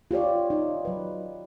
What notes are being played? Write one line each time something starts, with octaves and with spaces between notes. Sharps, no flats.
F4 G4 C#5 D5
D#4
F#3 B4